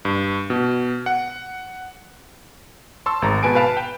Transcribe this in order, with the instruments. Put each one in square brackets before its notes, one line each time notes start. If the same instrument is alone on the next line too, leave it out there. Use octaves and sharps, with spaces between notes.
[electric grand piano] G2
B2
F#5
A5 C6 C#6 E6
G#1 G#3 A#5
B2 B4 G#5 A5 D7
B4 F5 A5
G5